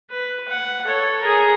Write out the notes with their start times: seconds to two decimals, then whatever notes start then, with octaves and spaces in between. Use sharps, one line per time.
0.10 B4
0.48 F#5
0.85 A4 C#5
1.21 G#4 A#4